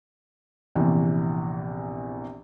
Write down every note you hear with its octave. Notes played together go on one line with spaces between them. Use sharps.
A#1 E2 C3 E3